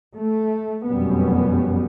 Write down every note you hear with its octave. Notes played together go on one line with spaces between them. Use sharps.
A3
F1 F#2 B2 G3 B3